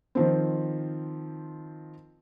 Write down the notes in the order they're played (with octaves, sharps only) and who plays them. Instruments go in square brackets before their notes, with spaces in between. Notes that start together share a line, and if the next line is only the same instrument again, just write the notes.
[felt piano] D#3 F3 C4